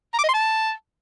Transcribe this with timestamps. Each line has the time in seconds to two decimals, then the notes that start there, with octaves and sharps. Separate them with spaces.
0.14 A#5
0.19 D6
0.24 D#5
0.29 C6
0.34 A5